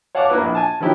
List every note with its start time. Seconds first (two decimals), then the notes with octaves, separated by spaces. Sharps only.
0.15 C#5 F5 F#5 A5 C#6 D6
0.30 A#3 E4 B4
0.41 A#1
0.55 G#5 A5
0.80 D#3 F3 F#3 E4 G4